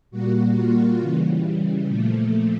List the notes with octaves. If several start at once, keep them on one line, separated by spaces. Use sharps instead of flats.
A#2 G3 A#3 F#4
F4
C#3 E3 G3
A#2 F3 A3